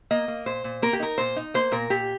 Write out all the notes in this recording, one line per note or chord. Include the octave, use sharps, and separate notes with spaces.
A#3 D#5
A#3
A#2 C5
A#2
A#3 A#4
G4
D#4 A#4
A#2 C5
D#4
A#3 C5
A#2 A#4
A#2 G4